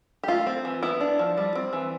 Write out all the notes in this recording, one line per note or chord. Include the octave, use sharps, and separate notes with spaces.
G4
A3 F4
C4
E3
B3 E4
D4
F3
G3
C4
E3